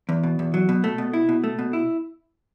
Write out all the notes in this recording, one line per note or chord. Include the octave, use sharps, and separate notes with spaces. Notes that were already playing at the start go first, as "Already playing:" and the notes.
E2
B2
E2
F#3
B2
A3
B2
E4
B2
A3
B2
E4